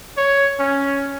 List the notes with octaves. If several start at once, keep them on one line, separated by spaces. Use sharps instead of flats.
C#5
C#4